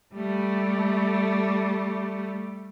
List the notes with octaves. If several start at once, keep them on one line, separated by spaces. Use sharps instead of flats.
G3 A3